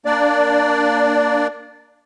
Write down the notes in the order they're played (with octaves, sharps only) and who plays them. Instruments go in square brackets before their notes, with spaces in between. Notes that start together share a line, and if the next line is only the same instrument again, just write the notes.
[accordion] A#3 D4 D5